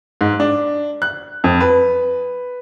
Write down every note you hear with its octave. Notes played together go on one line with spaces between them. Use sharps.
G#2
D4
F#6
F2
B4